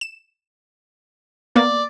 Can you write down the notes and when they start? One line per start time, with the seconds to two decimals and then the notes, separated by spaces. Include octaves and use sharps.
0.01 E7
1.56 A#3 B3 D5